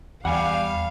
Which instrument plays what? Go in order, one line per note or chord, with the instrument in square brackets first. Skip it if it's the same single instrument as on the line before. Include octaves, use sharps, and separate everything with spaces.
[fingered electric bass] E2 [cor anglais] G3 [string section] F5 [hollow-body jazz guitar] F#5 G#5